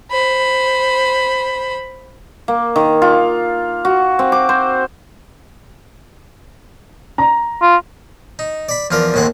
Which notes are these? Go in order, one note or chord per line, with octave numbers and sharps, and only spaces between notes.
C5 B5
A#3
D#3
F4
F#4
C4
D6
C5
A#5
F4
D#4
D5 B5
E2 F3 F4 A#4 D5
D#2 A2 G#3 C4 F#5